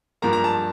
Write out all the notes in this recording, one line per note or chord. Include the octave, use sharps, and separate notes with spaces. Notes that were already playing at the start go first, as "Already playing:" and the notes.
G2 F3 A#3 A#5
A#5
A5